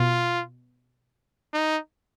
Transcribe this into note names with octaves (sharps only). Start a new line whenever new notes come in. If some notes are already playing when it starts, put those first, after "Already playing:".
Already playing: B2 F4
D#4